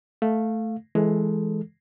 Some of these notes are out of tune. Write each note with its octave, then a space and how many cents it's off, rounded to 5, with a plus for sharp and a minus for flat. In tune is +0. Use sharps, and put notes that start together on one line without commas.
A3 +0 F5 +0
E3 +0 G#3 +10 A4 +0